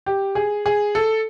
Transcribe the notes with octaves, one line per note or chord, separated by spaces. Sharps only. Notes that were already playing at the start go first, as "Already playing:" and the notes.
G4
G#4
G#4
A4